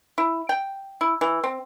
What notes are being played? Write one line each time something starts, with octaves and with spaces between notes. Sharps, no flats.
E4
G5
E4
E3
C4